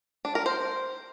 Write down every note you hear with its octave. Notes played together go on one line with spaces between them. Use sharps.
D4
A#4
C5